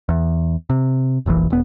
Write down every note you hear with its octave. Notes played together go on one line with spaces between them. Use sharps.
E2
C3
F1 A#1 A#2 E3
E1 B3